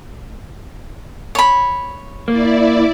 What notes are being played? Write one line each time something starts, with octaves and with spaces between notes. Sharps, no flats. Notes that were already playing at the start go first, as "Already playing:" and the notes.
C#5 B5
A#3 E4 D5